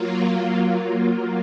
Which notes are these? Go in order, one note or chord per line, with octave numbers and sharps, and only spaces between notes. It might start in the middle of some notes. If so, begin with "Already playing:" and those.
Already playing: F#3 A#3 F4